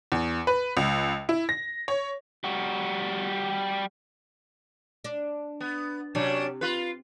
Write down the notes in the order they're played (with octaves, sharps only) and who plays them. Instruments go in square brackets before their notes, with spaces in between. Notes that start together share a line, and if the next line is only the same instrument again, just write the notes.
[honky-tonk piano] E2
B4
C#2
E4
A#6
C#5
[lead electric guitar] G3 F#4
[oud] D4
[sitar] B3
[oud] C3 [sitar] F#3 C#4 D4
[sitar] F4 B4